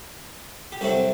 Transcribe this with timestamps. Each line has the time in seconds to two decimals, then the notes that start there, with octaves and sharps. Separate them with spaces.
0.72 G4
0.81 C2 C3 F#3 A3 C4 F#4 A4